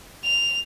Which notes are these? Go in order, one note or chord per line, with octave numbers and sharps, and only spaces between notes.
F7